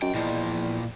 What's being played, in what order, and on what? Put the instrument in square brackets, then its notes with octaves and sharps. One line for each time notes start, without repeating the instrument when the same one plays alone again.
[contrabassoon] F#2 [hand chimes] D#5 [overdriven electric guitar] G5
[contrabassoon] E2 [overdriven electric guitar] A#2 F3 [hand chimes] D5 G5 B5